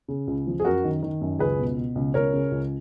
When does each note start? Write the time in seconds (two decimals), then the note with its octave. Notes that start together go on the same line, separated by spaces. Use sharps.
0.08 C#3
0.27 C#2
0.47 F3
0.60 G#4
0.65 F#2 F#4 A#4
0.84 D#3
1.02 D#3
1.21 F#2
1.39 C#2 G#4 B4
1.59 B2
1.78 B2
1.95 C#2
2.14 C#2 A#4 C#5
2.34 C#3
2.51 C#2